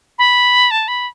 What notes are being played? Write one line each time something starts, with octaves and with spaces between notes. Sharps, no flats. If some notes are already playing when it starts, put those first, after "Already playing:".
B5
A5
B5